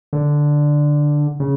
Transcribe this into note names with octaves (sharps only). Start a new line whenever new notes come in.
D3
C#3